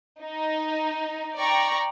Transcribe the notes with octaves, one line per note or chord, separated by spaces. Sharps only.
D#4
D5 G5 A#5 C#6